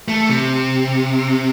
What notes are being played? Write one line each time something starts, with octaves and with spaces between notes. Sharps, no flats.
A3
C3